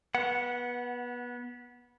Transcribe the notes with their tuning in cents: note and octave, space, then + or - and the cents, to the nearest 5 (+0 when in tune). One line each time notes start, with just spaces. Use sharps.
B3 -20 F#5 +0